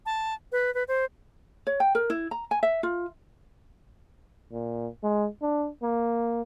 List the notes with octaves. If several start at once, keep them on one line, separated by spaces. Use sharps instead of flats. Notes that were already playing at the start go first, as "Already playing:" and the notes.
A5
B4
B4
C5
C#5
G5
A#4
E4
A#5
G#5
E5
F4
A#2
G#3
D4
A#3